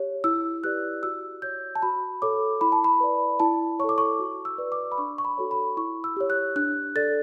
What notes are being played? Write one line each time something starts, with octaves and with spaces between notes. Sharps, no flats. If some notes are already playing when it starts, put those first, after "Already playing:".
Already playing: G4 C#5
E4 E6
G4 B4 D5 F#6
F#4 E6
C#5 G6
A5
F#4 B5
A4 C#5 D6
E4 B5
A5
B5
B4 D5
E4 A5
A4 C#5 C#6
D6
C#6
F#4
E6
B4 D5
D6
B5
D4 C#6
C#6
B5
F#4 A4 C#5
B5
E4 C#6
E6
G4 C#5
F#6
D4 F#6
A4 D5 A6